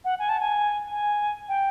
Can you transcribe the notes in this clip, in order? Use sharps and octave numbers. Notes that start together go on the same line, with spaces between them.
F#5
G#5
A5
G#5
G#5
G5